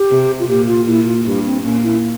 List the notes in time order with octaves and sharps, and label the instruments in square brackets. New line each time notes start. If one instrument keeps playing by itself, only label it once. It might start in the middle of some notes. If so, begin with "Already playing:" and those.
Already playing: [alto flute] G4
[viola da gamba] C3
[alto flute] F4
[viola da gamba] A#2 [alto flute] G4
[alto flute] F4
[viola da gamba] A#2 [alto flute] E4
[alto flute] F4
[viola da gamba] G2 [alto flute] G4
[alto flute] C4
[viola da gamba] A#2 [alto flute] C#4
[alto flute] E4